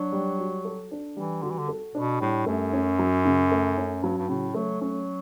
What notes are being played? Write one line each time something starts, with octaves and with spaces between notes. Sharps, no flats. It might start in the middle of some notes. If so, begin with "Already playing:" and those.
Already playing: F#3 D4
G3
F#4
A4
D4
E3 G3
D3 F#4
E3
D3
A4
B2 D4
A2 G3
F#2 A3
C#4
F#3
C#3
A3
C#4
G2 F#3
G2
A2 C#3
F#3 A3
F#3 C#4